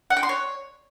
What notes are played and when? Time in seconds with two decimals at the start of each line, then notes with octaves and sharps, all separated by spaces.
0.10 F#5
0.17 G5
0.23 C6
0.29 C#5